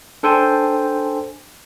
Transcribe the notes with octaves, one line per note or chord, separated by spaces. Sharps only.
D4 A4 C5 G5 G#5